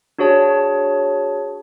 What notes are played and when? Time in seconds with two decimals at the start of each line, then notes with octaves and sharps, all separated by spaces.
0.18 D4 F#4 G#4 C#5 A5